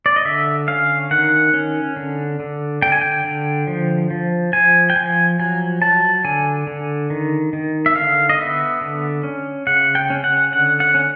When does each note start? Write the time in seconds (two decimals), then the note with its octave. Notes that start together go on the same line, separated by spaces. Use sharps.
0.06 D5
0.16 D#5
0.25 D3 E5
0.68 C#4 F5
1.11 D#3 F#5
1.54 C#4
1.96 D3
2.40 D3
2.82 D3 G5
2.92 G#5
3.01 G5
3.25 D3
3.67 F3
4.11 F3
4.53 F3 G#5
4.90 G5
4.96 F3 G#5
5.39 F#3 G#5
5.82 F#3 A5
6.24 D3 G#5
6.67 D3
7.10 D#3
7.53 D#3
7.86 E5
7.95 D3 F5
8.29 D#5
8.38 B3 E5
8.81 D3
9.23 C#4
9.67 C#3 F#5
9.95 G5
10.10 C#4
10.24 F#5
10.52 D3 F#5
10.80 F#5
10.95 C#4